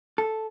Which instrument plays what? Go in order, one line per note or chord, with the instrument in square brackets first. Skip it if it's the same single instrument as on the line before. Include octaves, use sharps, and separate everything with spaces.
[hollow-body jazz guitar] A4